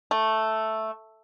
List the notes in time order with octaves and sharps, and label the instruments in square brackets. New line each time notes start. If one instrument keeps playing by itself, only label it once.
[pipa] A3